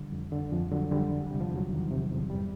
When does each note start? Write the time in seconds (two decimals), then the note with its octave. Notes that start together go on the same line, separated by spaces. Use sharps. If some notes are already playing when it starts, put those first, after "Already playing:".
Already playing: D3 G3
0.12 F2
0.32 D3
0.52 F2 F3
0.72 D3 F#3
0.92 D3 G3
1.11 E2
1.26 C3 G3
1.40 F3
1.51 E2 F#3
1.71 D#3
1.91 C3
2.11 E2
2.30 G2 G3